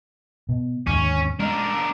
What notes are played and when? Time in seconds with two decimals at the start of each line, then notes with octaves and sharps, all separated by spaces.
0.49 B2
0.87 D#2 G#2 D3 C#4
1.40 G#3 C#4 D4 A#4